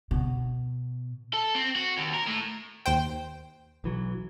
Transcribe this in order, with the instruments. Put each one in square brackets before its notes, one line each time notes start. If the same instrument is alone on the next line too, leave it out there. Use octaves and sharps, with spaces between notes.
[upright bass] B2
[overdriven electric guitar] A4
C4
F#4
D#2
A#4
A2
[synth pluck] D#2 C5 G5
[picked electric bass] B1 E3 F#3